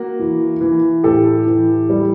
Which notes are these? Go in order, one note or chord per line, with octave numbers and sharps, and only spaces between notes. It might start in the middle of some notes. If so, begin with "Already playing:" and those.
Already playing: A#3 F#4
E3
E3
A2 G4 A4
E3
G3